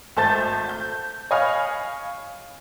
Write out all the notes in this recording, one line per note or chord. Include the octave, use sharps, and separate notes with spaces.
G#1 A3 A5 G6 A6
G6
C#5 D#5 F5 G#5 B5 F6